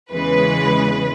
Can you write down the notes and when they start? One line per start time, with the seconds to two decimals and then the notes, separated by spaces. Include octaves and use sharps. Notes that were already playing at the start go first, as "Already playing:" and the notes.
0.12 E2 C#3 E3 G#3 B4